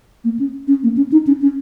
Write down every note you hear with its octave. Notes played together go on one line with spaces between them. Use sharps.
A#3
C#4
C#4
A#3
C#4
D#4
C#4
C#4